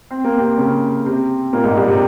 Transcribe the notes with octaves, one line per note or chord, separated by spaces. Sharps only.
C4
A#3
C3 C4
C#3 C#4
C3 C4
A#2 A#3
G#2 G#3
G2 G3
C3